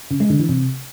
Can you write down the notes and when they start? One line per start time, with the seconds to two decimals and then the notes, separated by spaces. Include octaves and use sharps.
0.11 C#3
0.20 G#3
0.30 D3
0.40 E3
0.49 C3